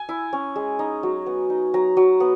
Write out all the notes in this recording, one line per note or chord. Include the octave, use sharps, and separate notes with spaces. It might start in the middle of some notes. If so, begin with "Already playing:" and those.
Already playing: G#5
E4
C#4
G#3
D#4
F#3
B3
D#4
F#3 A#5
F#3
B3